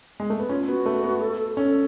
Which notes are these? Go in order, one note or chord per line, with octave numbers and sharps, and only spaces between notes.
G#3
A3
B3
C#4 F4
B3 F#4
A3
B3
A4
C#4 A4